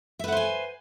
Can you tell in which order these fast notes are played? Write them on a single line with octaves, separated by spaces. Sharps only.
E5 B4 F#5 C5 G#5